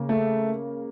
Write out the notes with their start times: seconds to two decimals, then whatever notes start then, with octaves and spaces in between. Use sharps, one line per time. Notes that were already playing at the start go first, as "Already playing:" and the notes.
Already playing: C#3 A#3
0.09 A3